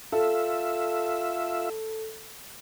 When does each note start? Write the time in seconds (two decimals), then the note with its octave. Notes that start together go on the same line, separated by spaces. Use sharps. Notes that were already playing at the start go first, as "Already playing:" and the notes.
0.12 F4 A4 E5